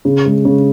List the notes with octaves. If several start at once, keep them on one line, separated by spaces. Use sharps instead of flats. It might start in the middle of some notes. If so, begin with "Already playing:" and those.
C#3
G#3
C#3